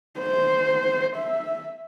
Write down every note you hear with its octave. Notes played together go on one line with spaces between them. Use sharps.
C5
E5